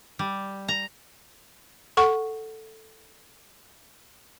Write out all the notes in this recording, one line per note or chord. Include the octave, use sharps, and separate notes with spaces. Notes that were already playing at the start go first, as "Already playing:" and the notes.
G3
A#5
A4 F#5 C#6